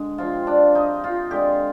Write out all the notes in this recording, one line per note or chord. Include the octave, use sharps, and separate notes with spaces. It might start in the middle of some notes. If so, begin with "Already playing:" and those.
Already playing: D3 G#3
C3 F3 C4 F4
D4
D#4
F4
D3 G#3 C4 G4